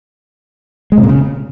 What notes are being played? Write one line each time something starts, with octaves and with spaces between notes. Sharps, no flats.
G#3
C3
A#2
C#3